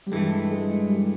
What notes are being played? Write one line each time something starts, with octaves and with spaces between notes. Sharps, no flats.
G3
G2 E3 G#3 A3
G#3
G3
G#3